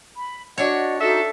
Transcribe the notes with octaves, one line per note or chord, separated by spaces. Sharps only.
B5
D4 F#4 C#5 D#5 F#5
D#4 F#4 A4 E5 E6